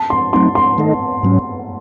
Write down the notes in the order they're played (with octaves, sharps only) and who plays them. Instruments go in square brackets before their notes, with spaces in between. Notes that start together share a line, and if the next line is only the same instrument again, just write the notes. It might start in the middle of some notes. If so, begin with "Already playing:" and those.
Already playing: [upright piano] A5
C6
[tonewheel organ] F#3 A3 C4 D#4 [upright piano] C6
[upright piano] C6
[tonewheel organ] D#3 A3 D#4 A4 D#5
G#2 F#3 C#4